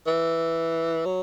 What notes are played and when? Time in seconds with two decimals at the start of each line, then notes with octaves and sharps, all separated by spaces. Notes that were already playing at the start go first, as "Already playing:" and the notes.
0.07 E3
1.06 F#3